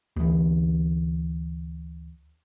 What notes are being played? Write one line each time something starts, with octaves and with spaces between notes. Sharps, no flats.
D2 E3